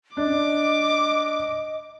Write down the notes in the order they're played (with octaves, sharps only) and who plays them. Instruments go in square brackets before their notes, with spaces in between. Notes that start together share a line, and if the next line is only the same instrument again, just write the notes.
[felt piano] D4 [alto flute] D#5 [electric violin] D6